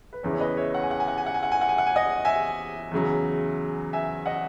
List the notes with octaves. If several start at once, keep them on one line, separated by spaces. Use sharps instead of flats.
B4
E2 C#3 E3 C#5
C#5
B4 D#5
C#5 E5
F#5
G#5
F#5
G#5
F#5
G#5
F#5
G#5
F#5
G#5
F#5
G#5
F#5
G#5
D#5 F#5
E5 G#5
E2 C#3 F#3
E5 G#5
D#5 F#5